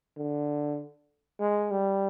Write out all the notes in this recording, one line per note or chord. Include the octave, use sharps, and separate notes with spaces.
D3
G#3
G3